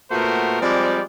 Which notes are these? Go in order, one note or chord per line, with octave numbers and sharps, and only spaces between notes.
A#2 A3 B3 F#4 A#4 C5
F3 G3 G#3 C4 D5